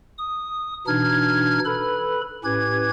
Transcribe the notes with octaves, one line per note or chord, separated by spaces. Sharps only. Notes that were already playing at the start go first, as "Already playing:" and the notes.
D#6
B2 E3 D4 D#4 F6 G#6
A4 B4 B5
A2 C#4 G4 B4 G#6